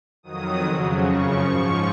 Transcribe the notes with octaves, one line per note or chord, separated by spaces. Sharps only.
F2 D#3 F#3 D#6
F2 C#3 F#3
F#2 C#3 F3 C#6
G#2 F3 C#6